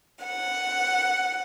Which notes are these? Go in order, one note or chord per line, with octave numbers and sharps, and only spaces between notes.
F#5